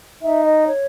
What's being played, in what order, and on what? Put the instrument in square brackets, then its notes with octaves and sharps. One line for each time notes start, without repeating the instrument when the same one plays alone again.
[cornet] D#4 [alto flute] E5
[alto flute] D#5
C#5